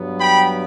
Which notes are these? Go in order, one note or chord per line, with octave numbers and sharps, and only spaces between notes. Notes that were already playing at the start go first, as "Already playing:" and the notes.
Already playing: G2 F#3 B3
G5 B5